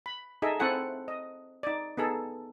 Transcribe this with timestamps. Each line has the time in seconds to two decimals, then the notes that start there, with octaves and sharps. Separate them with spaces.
0.06 B5
0.42 D#4 G#4 A4 D#5 E5
0.59 C4 E4 A4 F#5 G#5
1.08 D#5
1.63 D#4 D5
1.97 B3 D#4 G#4 A4